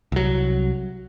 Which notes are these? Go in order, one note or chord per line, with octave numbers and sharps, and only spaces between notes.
C2 F#3